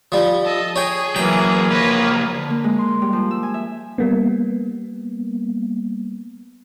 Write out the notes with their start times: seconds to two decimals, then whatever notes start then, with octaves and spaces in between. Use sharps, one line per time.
0.12 F3 G3
0.45 A4 D#5
0.76 G#4 C#5 G5
1.16 E3 F#3 A#3 G5
1.70 C#2 F3 A#3 B4 C#5
2.35 D3
2.50 A#3
2.64 G#3
2.78 C6
3.02 G3
3.13 F3
3.31 E6
3.43 G#5
3.54 E5
3.98 G3 A#3 B3